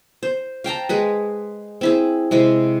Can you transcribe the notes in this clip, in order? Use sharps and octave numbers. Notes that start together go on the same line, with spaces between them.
C5
F5 G5 A5 A#5
G#3 G#4 B4
C4 E4 G#4
C3 G#3 E4